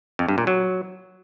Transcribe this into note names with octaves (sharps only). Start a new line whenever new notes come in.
F2
G2
A#2
F#3